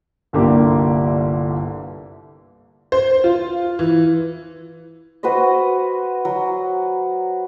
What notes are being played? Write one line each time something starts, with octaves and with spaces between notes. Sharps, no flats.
G1 C2 D3 A#3 G4 D6
C5
F4
E3
F#4 B4 C5 D#5
F#3